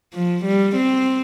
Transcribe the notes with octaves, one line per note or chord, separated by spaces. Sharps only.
F3
G3
C4